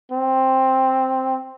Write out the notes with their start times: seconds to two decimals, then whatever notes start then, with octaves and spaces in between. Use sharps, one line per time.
0.12 C4